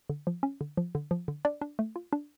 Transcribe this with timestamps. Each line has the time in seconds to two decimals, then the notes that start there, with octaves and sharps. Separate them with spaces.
0.10 D3
0.27 F3
0.43 C#4
0.61 D3
0.77 F3
0.95 D3
1.11 F3
1.28 D3
1.45 D4 D5
1.61 D4
1.79 A3
1.96 F4
2.13 D4